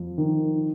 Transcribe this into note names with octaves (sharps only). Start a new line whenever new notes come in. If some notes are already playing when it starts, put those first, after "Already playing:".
Already playing: F2
D#3